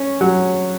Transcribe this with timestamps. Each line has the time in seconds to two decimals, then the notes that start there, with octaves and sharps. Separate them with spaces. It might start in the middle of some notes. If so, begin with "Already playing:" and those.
Already playing: C#4
0.21 F#3